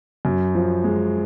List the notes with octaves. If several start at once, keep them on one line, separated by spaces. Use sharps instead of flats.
F#2
F3
G#3